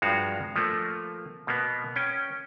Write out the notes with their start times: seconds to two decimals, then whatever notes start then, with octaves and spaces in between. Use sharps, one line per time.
0.02 G2 F3 G#3 F#4 F5 A#5
0.56 F3 A3 A#3
1.47 B2 A#3 B3
1.96 C#4 G5